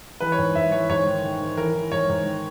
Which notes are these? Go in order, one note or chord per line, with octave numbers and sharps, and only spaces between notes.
E3 B4
C#5
G#2
G#2 E5
E3 C#5
G#2 C#5
D#3
D#3
D#3
E3 A#4
E3
G#2 C#5
G#2
D#3